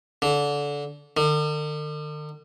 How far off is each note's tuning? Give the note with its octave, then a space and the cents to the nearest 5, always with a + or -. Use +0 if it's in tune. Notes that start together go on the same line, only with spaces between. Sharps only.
D3 -25
D3 +45